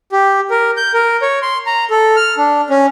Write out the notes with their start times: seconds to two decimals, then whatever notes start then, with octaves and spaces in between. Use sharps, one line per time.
0.12 G4
0.50 A#4
0.77 G6
0.94 A#4
1.22 C#5
1.42 C6
1.66 A#5
1.90 A4
2.16 F6
2.37 D4
2.70 C#4